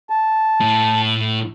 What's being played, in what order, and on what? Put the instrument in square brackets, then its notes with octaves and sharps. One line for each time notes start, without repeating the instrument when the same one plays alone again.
[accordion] A5
[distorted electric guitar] A2